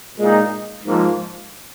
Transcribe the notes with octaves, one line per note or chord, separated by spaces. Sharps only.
A#2 G#3 D#4
G#2 F3 A#3